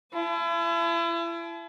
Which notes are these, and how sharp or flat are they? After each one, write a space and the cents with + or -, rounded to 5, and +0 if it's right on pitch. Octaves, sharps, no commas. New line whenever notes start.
E4 +35 A5 -35